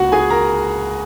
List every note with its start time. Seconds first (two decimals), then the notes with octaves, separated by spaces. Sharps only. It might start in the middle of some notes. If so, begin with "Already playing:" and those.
Already playing: C#2 C#3 A#3 F#4 F#5
0.12 G#4 G#5
0.30 A#4 A#5